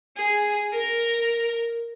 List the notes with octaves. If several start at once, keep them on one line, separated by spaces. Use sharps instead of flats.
G#4
A#4